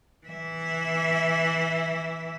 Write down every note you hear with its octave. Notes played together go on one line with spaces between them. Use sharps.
E3 E5